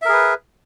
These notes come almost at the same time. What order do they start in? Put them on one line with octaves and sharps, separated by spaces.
E5 A#4 G#4 B4